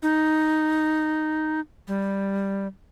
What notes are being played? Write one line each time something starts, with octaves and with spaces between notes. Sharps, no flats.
D#4
G3